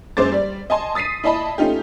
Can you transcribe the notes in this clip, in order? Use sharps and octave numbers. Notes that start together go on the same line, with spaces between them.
F#2 G#3 C5 D6 A6
G3 D5
D#5 G#5 A5 C6
D#6 A6 B6 C7 D#7
E4 D5 D#5 A5 B5
A3 C#4 D#4 F4 G4